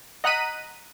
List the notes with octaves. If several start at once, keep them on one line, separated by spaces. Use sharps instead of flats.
D#5 F#5 A#5 F#6 B6 D#7